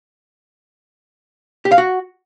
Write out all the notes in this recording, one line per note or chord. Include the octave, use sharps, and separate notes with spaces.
G4
F5
F#4